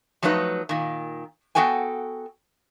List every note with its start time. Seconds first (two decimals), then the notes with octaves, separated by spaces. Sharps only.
0.23 F3 F#3 A3 D#4 B4
0.69 A#2 D#3
1.55 B3 C4 F#4 A4 G5 G#5